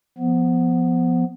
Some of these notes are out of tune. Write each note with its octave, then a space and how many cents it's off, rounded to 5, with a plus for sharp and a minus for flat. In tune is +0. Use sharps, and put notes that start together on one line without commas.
F3 +0 B3 +0